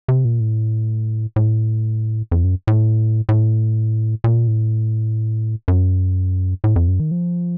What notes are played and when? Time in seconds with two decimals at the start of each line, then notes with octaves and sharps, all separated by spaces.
0.08 C3
0.25 A#2
0.40 A2
1.36 A2
2.32 F2
2.44 F#2
2.67 A2
3.29 A2
4.24 A#2
4.48 A2
5.68 F#2
6.64 A2
6.76 F2
6.88 F#2
7.00 D#3
7.11 F3